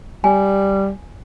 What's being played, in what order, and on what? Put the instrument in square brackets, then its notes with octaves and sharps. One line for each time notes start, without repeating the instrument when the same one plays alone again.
[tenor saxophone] G3 [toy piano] G#5